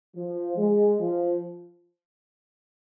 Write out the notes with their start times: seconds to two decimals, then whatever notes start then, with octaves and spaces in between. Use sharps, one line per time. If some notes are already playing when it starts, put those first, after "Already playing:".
0.15 F3
0.57 G#3
1.00 F3